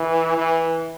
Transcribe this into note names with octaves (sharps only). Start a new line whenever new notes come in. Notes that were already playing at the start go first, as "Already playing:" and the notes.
Already playing: E3
E3